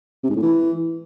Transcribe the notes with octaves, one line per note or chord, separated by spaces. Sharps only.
C3
G#2
A2
E3